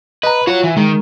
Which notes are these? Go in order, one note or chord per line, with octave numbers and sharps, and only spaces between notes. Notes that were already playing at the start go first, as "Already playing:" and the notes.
B4 D#5 A#5
F4 F#4 C#5
E3
D#3 G#3